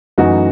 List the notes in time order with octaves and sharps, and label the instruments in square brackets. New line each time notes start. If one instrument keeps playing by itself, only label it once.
[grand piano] F#2 E3 A3 D#4 F#4